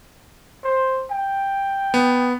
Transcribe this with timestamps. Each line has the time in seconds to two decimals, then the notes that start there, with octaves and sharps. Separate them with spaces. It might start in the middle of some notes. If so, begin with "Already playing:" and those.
0.63 C5
1.11 G5
1.94 B3